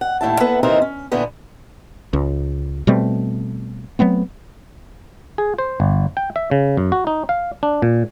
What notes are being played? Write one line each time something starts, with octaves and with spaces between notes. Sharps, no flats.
F#5
D#2 A2 C#3 E4 A5
A#3 B3 A4 B4 E5 F#5
D#2 C3 E3 D#4 A#4 C5
C#4
A#2 D3 E3 B3
C#2
B2 G3 A3 C4
F#3 A3 B3 C4
G#4
C5
G1
G5
E5
C#3
F#2
F#4
D#4
F5
D4
A#2